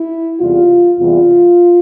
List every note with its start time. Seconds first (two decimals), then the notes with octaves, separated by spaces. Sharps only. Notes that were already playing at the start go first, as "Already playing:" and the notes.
Already playing: E4
0.40 E2 C3 G3 F4
0.98 E2 C3 E3 G3 F4